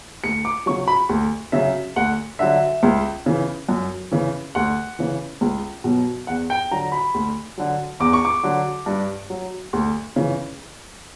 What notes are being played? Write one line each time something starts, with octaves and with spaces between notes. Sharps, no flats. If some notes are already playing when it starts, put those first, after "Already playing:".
D2 C#7
D6
C#3 F#3 C#6
B5
D2
C#3 F#3 E5
D2 F#5
D3 F#3 E5
C#2
C#3 E3
F#2
C#3 E3
D2 F#5
C#3 E3
C#2
B2 F#3
E2 F#5
G5
D3 F#3 A#5
B5
D2
D3 F#3
E2 D6
C#6
D6
D3 F#3
G2
F#3
D2
C#3 E3